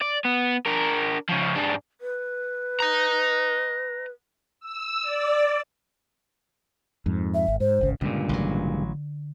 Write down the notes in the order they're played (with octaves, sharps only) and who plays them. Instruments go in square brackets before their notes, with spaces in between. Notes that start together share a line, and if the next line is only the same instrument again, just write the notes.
[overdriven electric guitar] D5
B3
D4 A#4
C#3 F3
G#2 D4
[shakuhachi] B4
[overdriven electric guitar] D#5 A#5
[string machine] E6
D5
[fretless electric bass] F2 G#2
[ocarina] E5
[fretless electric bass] G#1
[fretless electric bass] G#2 [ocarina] C5
[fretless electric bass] D1 G#1 C#3
[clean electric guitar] C#2 G2 A#2 [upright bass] D3
[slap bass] A1 F#3